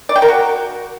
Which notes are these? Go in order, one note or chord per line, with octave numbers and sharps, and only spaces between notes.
D5
G5
A#4
F#4